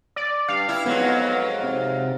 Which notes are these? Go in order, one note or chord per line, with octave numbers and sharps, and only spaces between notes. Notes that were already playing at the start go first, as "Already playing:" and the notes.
D5
G2 F5
E4
F2 G#2 F#3 B3
C3